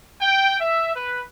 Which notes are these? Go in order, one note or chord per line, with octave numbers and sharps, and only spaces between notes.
G5
E5
B4